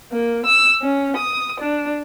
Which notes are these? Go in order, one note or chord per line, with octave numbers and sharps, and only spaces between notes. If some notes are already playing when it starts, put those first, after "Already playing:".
A#3
E6
C#4
D#6
D4